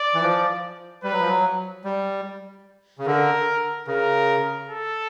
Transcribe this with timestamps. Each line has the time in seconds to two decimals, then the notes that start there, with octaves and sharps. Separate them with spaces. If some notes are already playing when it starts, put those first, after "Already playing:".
Already playing: D5
0.14 E3
0.22 F3
1.03 G3 B4
1.12 F#3
1.20 F3
1.28 F#3
1.84 G3
2.98 C#3
3.06 D3 A#4
3.87 C#3 A#4
4.69 A4